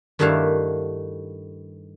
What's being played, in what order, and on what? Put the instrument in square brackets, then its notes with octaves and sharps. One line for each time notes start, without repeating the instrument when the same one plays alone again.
[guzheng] G2 D#3 A3 E4 F#4 F5